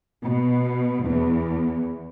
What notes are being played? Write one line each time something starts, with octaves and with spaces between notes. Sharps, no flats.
B2
E2